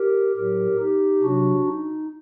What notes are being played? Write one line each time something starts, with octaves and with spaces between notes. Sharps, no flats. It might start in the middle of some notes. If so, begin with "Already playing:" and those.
Already playing: G4 A#4
A2 F#3 G4 A#4
D#4 G4
C3 F#3 D4 F#4
D#4